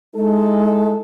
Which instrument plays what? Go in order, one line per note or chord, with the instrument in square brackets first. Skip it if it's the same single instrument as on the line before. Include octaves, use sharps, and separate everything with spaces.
[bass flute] G#3 [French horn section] D#4 E4 A4